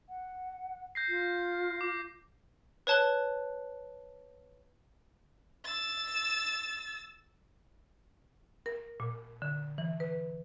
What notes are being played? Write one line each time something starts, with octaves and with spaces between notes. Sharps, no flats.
F#5
G6 A#6 C7
F4
D6
B4 C#5 A5 F#6 G7
E6 A6
A#4
A#2
D3
E3
B4